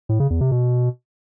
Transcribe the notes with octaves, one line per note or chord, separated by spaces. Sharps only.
A2
C#3
E2
C3
B2